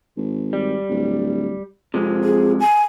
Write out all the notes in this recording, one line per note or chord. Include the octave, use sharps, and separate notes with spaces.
G#1
G3
D1
F2 C3 G#3
G#4
G#5